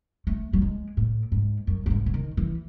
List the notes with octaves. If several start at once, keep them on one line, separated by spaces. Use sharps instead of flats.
A3
F#3
G#3
A2
G#2
F#2
F#2
G#2
C#3
D#3
E3